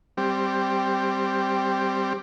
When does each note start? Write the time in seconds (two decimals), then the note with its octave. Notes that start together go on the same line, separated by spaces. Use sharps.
0.17 G3 C4